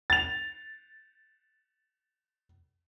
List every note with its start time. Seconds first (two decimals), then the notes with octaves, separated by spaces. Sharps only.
0.10 A6 F7